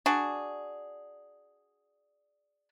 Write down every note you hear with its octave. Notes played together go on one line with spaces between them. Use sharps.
D4 F#4 G#4